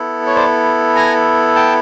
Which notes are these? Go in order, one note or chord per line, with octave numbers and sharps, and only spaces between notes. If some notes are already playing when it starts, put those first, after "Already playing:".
Already playing: B3 E4 A4
C#5
C5 D5
G#5 A#5
G5 A5